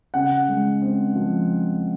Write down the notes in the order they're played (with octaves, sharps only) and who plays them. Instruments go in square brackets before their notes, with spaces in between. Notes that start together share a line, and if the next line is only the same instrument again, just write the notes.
[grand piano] C#3 F#5
G#3
C4
F3